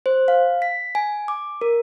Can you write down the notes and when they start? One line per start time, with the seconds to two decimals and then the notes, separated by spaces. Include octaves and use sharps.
0.06 C5
0.28 F5
0.62 B6
0.95 G#5
1.28 D6
1.61 A#4